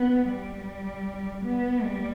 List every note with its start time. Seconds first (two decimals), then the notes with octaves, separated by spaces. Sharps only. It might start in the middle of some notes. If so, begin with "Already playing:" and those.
Already playing: B3
0.29 G3
1.46 B3
1.84 G3